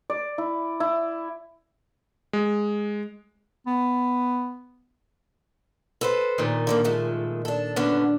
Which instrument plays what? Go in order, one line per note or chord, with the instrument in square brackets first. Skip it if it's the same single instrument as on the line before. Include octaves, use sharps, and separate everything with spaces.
[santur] D5
E4
E4
[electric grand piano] G#3
[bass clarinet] B3
[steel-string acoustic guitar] A4 B4 C5
[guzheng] A#2 D#3
[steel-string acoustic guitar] D3 A3 A#3
F3 G#3 A3
D4 A4
[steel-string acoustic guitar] D3 B3 C#4 [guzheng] D4